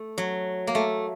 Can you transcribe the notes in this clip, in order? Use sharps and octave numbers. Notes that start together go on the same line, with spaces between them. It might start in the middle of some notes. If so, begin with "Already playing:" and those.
Already playing: A3
F#3
A#3
A3